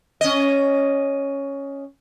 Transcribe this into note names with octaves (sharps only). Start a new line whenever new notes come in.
C#4 D#5